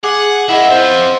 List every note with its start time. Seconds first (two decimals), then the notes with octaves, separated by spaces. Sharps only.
0.04 G#4 F#5 D6
0.49 E4 A#4 D#5 E5 F#5
0.71 C4 F4 C5